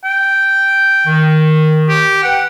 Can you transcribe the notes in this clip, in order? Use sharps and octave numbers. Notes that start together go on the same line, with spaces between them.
G5
D#3
G4
B4 F#5 G5